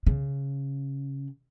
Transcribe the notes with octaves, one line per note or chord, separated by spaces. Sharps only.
C#3